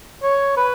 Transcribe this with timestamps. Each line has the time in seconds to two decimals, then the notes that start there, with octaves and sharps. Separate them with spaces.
0.23 C#5
0.57 B4